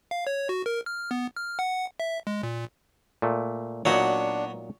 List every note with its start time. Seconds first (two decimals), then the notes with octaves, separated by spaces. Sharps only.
0.11 F5
0.27 C#5
0.49 F#4
0.66 A#4
0.86 F6
1.11 B3
1.36 F6
1.59 F#5
2.00 E5
2.27 G#3
2.43 A#2
3.22 A#2 A3
3.85 A#2 F#3 B3 D4 D#4 F#4 C#5